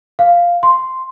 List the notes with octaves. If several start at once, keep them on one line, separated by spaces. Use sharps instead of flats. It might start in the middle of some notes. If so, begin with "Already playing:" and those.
F5
C6